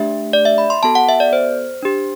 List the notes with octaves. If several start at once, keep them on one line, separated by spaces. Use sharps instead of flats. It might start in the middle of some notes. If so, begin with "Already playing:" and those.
Already playing: A3 D4 G4 E5
D5
E5
B5
C6
B3 F#4 A4 A5
F#5
E5
D5
C5
D4 G4